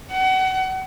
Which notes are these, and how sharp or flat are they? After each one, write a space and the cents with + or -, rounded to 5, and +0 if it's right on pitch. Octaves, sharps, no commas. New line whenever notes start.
F#5 +30